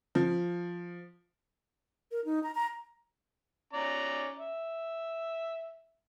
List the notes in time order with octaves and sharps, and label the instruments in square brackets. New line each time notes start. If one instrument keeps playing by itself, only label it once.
[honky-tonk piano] F3
[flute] A#4
D#4
A#5
A#5
[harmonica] C#4 D5 A#5
E5